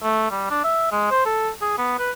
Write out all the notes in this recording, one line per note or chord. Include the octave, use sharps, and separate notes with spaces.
A3
G3
D4
E5
G#3
C5
A4
G#4
B3
B4